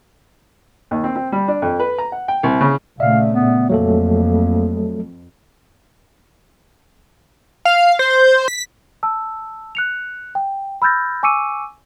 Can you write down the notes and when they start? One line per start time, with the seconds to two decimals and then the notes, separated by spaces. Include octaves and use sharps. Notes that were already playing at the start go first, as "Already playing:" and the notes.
0.91 D#2
1.04 C4
1.16 C4
1.32 G3
1.48 D4
1.62 F2
1.80 B4
1.98 A#5
2.12 F#5
2.28 G5
2.43 C2
2.61 C#3
3.00 A#2 C#3 A3 D5 E5 F5
3.33 B3
3.70 F2 F#3 A3 A#3 A4
7.65 F5
7.99 C5
8.48 B6
9.03 A5 E6
9.75 F#6 C#7 F7
10.35 G5
10.82 B5 E6 F6 G6 A6 A#6
11.23 G#5 C#6 D6 E6 C#7 D#7